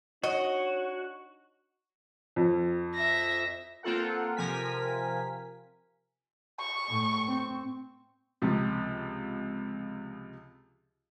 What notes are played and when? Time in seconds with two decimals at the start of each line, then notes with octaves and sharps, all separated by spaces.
0.23 D4 D#4 F#4 C#5 D#5
2.36 F2
2.94 E5 A#6
3.83 A#3 C4 F4 A4 F#5
4.37 C3 F3 A#4 G#5 B6
6.60 C#6
6.89 A2
7.28 C4
8.42 C#2 C3 F3